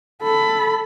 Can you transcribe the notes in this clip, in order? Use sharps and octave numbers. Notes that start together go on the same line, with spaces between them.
A4 B5